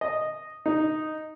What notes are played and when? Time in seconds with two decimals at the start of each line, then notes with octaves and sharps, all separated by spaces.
0.01 D#5
0.66 D#4